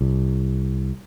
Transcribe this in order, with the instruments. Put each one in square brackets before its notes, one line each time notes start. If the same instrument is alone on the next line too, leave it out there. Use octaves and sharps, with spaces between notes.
[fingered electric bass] C2